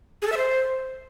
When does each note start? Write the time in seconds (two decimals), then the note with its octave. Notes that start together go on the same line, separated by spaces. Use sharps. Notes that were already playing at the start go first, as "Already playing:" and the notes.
0.22 G#4
0.27 A4
0.32 E5
0.37 C5